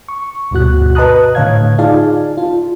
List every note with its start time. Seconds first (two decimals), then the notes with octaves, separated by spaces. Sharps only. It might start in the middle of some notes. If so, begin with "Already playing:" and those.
0.09 C#6
0.51 D2 G2 B2 F#4 F#6
0.95 B4 D#5 A5 A#5 D#6 F#6
1.35 A2 D3 C#5 F5 G#6
1.78 D#4 F4 G#4 D5 F5 A5
2.38 F4